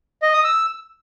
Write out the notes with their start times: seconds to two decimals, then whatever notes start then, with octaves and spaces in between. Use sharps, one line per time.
0.23 D#5
0.33 D#6
0.44 E6